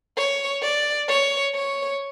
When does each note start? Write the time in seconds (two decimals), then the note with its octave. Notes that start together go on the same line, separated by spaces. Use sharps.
0.17 C#5
0.62 D5
1.08 C#5
1.55 C#5